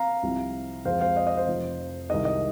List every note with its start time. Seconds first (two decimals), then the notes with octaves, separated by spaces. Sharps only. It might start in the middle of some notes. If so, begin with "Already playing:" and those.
Already playing: F5 A#5
0.23 C2 C3 F3
0.85 F2 F3 G#3 C5 F5
1.00 C5 F5
1.16 D#5
1.27 D#5
1.37 C5
1.48 F1 F2 F3
2.09 C2 C3 D#3 G#3 D#5
2.25 D#5